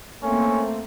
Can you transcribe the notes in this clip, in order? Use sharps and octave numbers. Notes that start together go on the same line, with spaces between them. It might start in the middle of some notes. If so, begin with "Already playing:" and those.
A3 A#3 C4 C#4